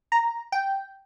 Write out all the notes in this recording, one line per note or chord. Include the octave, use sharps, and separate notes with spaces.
A#5
G5